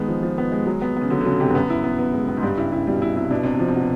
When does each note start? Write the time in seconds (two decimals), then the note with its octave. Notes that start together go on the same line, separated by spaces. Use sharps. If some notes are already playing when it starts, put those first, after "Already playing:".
Already playing: D#3 G#3 B3
0.08 F3
0.23 F3
0.38 B3
0.52 G#3
0.67 F#3
0.82 B3
0.97 C#3 B3
1.10 D3 F#3
1.21 D3
1.25 C#3 F#3
1.33 B2
1.40 C3 G4
1.50 G2
1.55 F#2 B3
1.70 E4
1.84 B3
1.99 B3
2.14 G#3
2.28 B3
2.37 G#2
2.43 G2 G3
2.57 C#3 E4
2.72 C#3 E4
2.87 B2 G3
3.02 C#3 E4
3.16 C3 E4
3.31 B2 D4
3.44 C3 D4
3.55 B2 F3
3.68 C3
3.76 B2 F#4